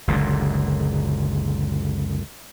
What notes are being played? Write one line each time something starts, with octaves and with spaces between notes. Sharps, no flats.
F#1 C#2 A#2 D3